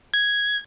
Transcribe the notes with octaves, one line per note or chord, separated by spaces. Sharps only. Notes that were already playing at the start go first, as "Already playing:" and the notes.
G#6